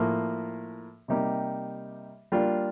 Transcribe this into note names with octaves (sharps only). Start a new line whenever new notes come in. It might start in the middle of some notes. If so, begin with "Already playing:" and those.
Already playing: A2 F3 A#3
C3 G3 A#3 D#4 G4
G3 A#3 D4 F4